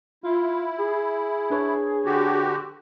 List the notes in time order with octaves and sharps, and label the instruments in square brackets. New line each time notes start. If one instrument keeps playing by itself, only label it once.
[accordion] E4 [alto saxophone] F4
[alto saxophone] G#4
[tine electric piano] D4 B4 C#5
[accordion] D3 F#4 G4